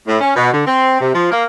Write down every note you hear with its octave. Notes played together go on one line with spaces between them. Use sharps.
A2
C#4
B2
D3
C4
C3
F3
A#3